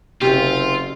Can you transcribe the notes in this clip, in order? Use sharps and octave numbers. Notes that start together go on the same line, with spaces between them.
F#1 C3 F4 G4